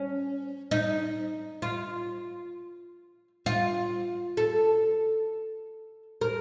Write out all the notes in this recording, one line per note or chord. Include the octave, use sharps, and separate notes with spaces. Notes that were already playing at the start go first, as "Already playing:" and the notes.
Already playing: C#4
D#4
F4
F4
A4
A#4